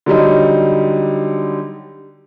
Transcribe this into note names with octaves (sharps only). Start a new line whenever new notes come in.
D3 F#3 G3 D#4